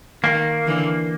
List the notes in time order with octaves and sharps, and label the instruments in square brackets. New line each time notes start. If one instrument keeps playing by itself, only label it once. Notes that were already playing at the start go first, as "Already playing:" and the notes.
[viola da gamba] D#3 [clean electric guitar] A#3
[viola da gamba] D3 E3